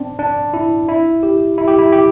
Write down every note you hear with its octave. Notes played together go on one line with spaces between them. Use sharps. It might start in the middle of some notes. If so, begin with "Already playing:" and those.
Already playing: C4 D4
D4
E4
E4
G4
E4
G4
E4
G4